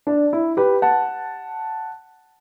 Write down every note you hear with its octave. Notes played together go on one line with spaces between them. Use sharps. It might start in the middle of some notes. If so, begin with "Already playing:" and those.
D4
E4
G4 B4
F#5 A5